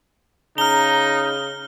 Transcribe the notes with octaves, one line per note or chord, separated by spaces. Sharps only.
C#3 D#4 A#5 F6 G7